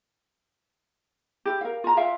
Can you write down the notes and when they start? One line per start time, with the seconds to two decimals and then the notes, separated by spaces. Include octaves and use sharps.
1.45 E4 G4
1.61 A#4 F5
1.84 F4 A#5
1.97 F4 E5 F5 G5